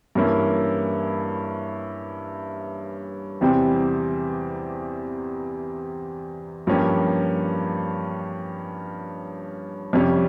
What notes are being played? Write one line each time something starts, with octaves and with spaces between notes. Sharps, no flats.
G2 E3 A#3 C#4 E4
E2 C3 G3 C4 G4
G2 F3 A#3 C#4 G4
F2 C3 G3 C#4